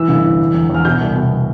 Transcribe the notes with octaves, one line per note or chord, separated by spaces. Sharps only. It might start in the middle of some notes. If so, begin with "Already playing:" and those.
Already playing: E3 E6
G1
E3
D3
E2
E2 F6
B2 G6
C2
B2